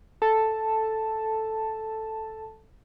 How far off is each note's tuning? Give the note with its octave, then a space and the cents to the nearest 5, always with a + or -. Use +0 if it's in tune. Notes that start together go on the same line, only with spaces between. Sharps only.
A4 +0 A5 +0